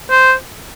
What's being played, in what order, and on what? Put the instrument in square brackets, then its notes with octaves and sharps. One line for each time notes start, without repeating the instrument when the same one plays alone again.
[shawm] C5